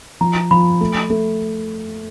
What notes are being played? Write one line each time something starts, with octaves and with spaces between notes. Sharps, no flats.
F3 A#5
F3 B5
A3
A3